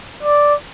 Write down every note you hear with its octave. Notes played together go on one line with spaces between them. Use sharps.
D5